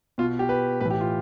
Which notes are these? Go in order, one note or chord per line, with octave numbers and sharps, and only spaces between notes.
B2 F4
G4
B4
A2 E3 B4
G4
F4